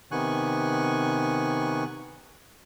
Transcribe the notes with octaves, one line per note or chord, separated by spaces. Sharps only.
C3 D#3 B3 G#5 C#6 F#6